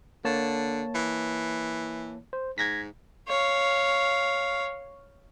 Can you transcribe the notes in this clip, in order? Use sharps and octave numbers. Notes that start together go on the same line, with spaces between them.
D3 A#3 C#5 A5
E3
C5
G#2 G#6 A#6 B6
C#5 F5